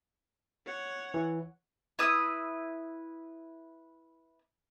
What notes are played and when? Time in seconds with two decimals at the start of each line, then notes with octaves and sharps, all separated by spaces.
0.66 C#5 F#5
1.14 E3
1.99 E4 B4 D#6 E6